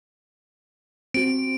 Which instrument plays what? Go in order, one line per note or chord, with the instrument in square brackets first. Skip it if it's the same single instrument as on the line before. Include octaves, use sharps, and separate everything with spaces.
[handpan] C4 F#4 [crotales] D7